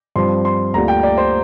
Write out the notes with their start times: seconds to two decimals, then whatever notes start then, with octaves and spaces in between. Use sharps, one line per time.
0.16 G2 F3 C4 C6
0.45 C6
0.73 D2 D3 G3 A#3 F4 A#5
0.88 G5
1.03 D5
1.18 C5